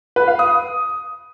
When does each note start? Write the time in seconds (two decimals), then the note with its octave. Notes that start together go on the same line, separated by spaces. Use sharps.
0.16 B4
0.28 F5
0.39 D#6